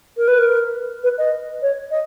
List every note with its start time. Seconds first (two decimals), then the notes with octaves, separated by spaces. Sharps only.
0.17 A#4
0.28 B4
0.38 A#4
1.03 B4
1.18 D#5
1.62 C#5
1.91 D#5